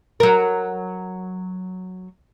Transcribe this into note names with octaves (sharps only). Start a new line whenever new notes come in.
F#3 A#4